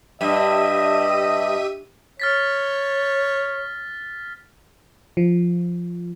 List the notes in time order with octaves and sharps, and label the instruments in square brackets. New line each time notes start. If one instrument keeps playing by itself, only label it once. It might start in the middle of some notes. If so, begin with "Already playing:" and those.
[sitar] G2 [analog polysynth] G4 E5 D#7 [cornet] D#5
[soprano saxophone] C#5 [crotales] F6 A6 B6
[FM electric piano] F3